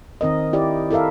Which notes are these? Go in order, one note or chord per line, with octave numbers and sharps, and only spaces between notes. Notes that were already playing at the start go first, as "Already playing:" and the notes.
D#3 C4 A#4 D#5
E4 G4 D5
E4 A4 A#4 E5 F5